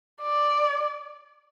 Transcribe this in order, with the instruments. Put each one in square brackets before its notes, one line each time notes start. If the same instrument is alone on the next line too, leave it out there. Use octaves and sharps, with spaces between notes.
[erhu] D5